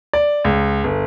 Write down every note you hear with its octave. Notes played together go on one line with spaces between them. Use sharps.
D5
C#2
G1